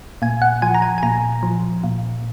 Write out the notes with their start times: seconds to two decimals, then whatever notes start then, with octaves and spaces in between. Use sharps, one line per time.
0.22 A#2 G#5
0.42 F#5
0.62 F3 G#5
0.74 A#5
0.82 G#5
0.98 G#5
1.03 A#2 A#5
1.43 F3
1.84 A#2